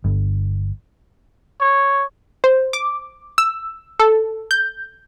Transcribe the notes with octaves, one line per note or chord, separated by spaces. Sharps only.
G1
C#5
C5
D6
E6
A4
G6